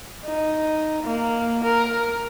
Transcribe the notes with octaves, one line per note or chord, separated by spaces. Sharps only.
D#4
A#3
A#4